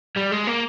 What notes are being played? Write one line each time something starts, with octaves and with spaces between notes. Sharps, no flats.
G3
G#3
A#3